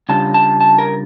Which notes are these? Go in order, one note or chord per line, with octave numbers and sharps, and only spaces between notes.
C#3 G3 D4 F4 A5
A5
A5
A#4